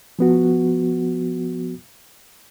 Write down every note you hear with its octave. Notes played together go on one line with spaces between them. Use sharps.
F3 B3 F#4